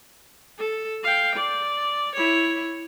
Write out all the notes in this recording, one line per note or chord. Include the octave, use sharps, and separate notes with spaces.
A4
F5 G5
D5
E4 C#5